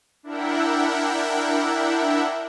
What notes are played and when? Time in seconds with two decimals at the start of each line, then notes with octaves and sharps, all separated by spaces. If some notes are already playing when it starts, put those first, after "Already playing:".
0.23 D4 E4 A#4 E5 F#5 G5